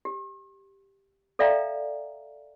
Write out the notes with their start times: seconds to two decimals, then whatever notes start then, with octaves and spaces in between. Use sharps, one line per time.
0.05 G4
1.39 A4 D5 E5 F5 G5 A#5